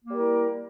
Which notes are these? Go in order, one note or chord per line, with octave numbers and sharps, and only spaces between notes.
G3 A#3 E4 A#4